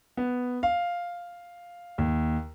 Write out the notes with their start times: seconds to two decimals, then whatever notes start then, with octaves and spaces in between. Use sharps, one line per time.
0.17 B3
0.63 F5
1.98 D#2